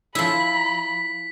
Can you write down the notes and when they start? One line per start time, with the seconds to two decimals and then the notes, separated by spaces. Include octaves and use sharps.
0.15 F3 E4 B5 B6